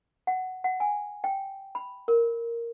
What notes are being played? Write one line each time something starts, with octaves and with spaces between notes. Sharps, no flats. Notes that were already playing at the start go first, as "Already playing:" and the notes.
F#5
F#5
G#5
G5
B5
A#4